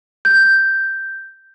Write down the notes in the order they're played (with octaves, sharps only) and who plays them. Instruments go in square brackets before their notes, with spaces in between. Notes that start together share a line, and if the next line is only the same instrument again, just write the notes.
[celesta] G6